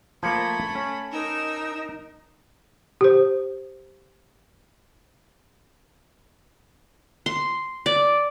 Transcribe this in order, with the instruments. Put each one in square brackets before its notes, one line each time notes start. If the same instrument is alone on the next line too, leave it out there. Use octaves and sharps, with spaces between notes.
[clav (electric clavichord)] F3 A#3 [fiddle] A3 B5 [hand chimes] A5 G#6 C#7
[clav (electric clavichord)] C#4
[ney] D#4 [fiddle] A#4 E6
[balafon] G4 C5
[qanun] C6
D5